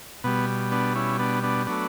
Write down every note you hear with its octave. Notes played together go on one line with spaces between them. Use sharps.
B2 G3 B3
B3 D4
C#4 E4
B3 D4
B3 D4
F#3 A3 B3 D4